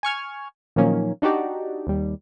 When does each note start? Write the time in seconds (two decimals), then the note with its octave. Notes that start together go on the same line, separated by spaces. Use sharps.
0.03 G#5 C#6 F6 G#6
0.76 A#2 D#3 F3 F#3 A#3 C#4
1.22 D4 D#4 F#4 G4 D5
1.87 D#2 G3